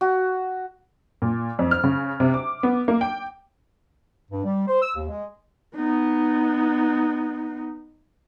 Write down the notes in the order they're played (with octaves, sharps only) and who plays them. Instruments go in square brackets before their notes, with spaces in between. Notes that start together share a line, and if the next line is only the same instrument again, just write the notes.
[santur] F#4
[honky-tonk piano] A#2
F2
F6
C#3
C3
D6
B3
A#3
G5
[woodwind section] G2
G3
C5
E6
D#2
G#3
[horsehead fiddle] B3 D#4